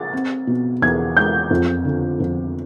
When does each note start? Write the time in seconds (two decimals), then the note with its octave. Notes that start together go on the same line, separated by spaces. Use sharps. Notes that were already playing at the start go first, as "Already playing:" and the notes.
Already playing: A6
0.13 C4
0.47 B2
0.82 E2 G#6
1.16 G#3 G6
1.50 F2
1.85 D3
2.20 F2